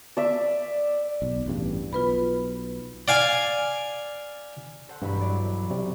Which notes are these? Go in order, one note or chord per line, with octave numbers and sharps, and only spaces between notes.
D5 E5
B1
A1 E2 G2
B1 F4 B4 B5
D5 F5 G#5
A4 C5 F#5
B1 G2 E3 B5
F#3 D5
C3 D5